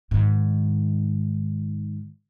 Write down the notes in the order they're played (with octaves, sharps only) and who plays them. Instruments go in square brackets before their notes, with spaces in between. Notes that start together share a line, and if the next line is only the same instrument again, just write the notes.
[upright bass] G#2 D#3